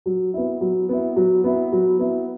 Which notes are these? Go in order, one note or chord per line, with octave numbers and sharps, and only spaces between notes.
F#3
B3 E4
F#3
B3 E4
F#3
B3 E4
F#3
B3 E4